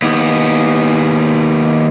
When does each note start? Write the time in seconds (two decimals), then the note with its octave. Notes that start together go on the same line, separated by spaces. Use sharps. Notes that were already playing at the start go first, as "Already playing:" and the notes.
0.02 D#2 B3